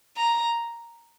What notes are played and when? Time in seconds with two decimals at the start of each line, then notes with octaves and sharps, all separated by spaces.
0.16 A#5